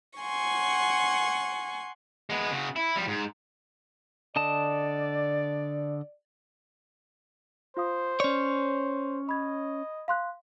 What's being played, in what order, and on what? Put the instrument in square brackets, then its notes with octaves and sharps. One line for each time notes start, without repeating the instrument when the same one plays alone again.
[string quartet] F#5 G#5 C6 C#6
[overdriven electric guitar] G#3 B3
C#3 F#4
E4
F3 G3
G#2
[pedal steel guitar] D3 D#5 A5 [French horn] D5
[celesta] F4 F5 D#6 [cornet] C5
[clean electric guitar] C#4 C#5 [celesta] D5
[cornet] D#5 [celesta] B5 G#6
[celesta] F5 C6 F#6